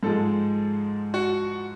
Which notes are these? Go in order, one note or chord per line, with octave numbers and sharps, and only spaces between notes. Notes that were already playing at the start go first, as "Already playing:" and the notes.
G#2 F3 G#3 A4
F#4